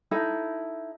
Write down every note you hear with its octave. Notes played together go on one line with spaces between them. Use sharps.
D#4 E4 A4